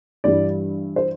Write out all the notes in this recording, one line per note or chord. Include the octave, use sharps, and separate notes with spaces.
G2 E3 G3 D5
C5